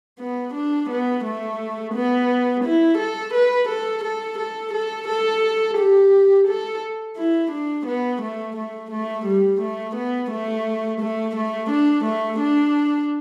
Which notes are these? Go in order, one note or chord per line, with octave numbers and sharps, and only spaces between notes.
B3
D4
B3
A3
B3
E4
A4
B4
A4
A4
A4
A4
A4
G4
A4
E4
D4
B3
A3
A3
A3
G3
A3
B3
A3
A3
A3
D4
A3
D4